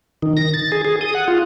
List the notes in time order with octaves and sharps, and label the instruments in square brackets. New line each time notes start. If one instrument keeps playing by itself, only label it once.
[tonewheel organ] D#3
A#6
A6
G#4
G#4
D#6
F#5
F4